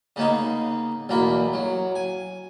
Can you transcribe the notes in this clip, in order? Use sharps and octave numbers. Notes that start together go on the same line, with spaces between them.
C#3 A#3 B3 D#4
B1 E2 A#3 A#4 B5
F#3
G#5